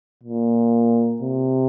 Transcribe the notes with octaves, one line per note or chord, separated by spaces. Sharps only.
A#2
C3